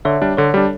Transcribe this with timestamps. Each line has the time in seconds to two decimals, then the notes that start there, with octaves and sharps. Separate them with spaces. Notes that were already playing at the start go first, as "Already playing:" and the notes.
0.05 D3 C#5 E5
0.22 G3 D4
0.37 D3 A4 C#5
0.54 G3 D4